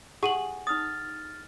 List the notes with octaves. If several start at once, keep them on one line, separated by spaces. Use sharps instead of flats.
G#4 F#5 C#6 D#7 F#7
D#4 D#6 F6 A6